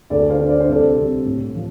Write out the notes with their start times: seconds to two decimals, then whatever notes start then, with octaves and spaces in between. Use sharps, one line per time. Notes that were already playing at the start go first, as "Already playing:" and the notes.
0.10 D2 A4 D5
0.29 C5 F5
0.39 D3
0.49 D5
0.60 C5
0.68 C2 A4 D5
0.97 C3
1.26 A2
1.55 F3